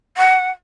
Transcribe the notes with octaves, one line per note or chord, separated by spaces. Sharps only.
F#5